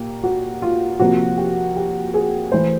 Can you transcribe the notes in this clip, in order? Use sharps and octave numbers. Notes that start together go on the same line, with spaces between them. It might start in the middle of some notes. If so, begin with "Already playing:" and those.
Already playing: A#2 A#3 G4
F#4
F4
C3 F3 A#3 F#4
G4
G4
G#4
E3 A3 C5